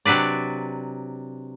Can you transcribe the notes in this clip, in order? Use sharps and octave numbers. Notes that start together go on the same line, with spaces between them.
C3 F#3 D4 B4 D5